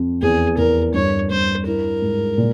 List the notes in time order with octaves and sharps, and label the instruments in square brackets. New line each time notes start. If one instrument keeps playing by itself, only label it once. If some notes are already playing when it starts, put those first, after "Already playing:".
Already playing: [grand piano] F2
[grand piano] E2 [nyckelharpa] G#4
[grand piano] E2 [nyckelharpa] A#4
[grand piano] G2 [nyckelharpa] C#5
[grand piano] G2 [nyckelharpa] C5
[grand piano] E4 [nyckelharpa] A#4
[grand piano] G#2
A#2